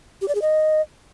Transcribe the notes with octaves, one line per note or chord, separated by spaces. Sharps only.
G4
D5
G#4
D#5